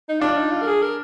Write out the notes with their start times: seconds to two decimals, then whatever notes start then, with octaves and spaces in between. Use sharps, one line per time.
0.09 D#4
0.21 D4 F4
0.36 D#4
0.52 F4
0.62 A#4
0.67 G#4
0.82 A#4